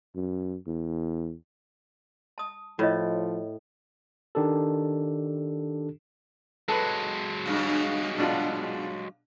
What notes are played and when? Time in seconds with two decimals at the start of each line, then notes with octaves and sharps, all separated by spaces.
0.15 F#2
0.66 E2
2.38 A5 D#6
2.79 A2 F3 F4 C#5 D#5
4.35 D#3 D4 G4 A4
6.68 F#3 G#3 A4 B4
7.46 G2 C#3
8.18 B2 D4 F4